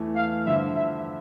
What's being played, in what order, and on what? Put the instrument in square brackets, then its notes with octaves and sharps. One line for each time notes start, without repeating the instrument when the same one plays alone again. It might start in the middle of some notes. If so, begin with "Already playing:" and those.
Already playing: [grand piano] E2 E3 A3
[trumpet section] F5
[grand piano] G2 D3 F3 [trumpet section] E5
[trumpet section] E5